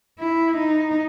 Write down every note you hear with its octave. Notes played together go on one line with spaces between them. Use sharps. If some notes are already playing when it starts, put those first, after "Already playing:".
E4
D#4